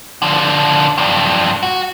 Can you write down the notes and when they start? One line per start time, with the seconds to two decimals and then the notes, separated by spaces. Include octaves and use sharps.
0.22 D3 F3
0.98 G2 F3
1.63 F#4